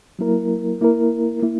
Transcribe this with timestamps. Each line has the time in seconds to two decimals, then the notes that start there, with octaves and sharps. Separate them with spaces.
0.19 F#3 A#3 E4 A#4
0.81 A#3 E4 A#4
1.43 A#3 E4